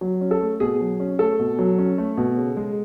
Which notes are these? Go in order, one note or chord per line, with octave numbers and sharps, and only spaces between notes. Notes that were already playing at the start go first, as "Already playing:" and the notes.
F#3
C#4
A4
A3
B2 G#4
F#3
C#4
A3 A4
B2
F#3
C#4
A3
B2
C#3
G#3